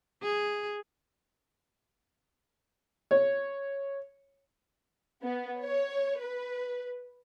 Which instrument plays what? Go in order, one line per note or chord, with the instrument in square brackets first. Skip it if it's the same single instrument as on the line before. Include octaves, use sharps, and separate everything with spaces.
[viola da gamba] G#4
[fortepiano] C#5
[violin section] B3
C#5
B4